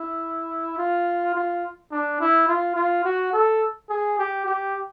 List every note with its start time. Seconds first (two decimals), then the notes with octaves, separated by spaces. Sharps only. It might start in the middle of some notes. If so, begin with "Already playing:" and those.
Already playing: E4
0.78 F4
1.35 F4
1.91 D4
2.20 E4
2.48 F4
2.76 F4
3.05 F#4
3.33 A4
3.90 G#4
4.19 G4
4.46 G4